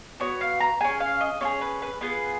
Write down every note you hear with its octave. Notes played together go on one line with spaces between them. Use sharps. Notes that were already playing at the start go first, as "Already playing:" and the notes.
B3 F#4 C#5
F5
A#5
C#4 G#4 G#5
F5
D#5
C#4 F4 G#4 C#5
B4
B4
B3 F4 G#4 B4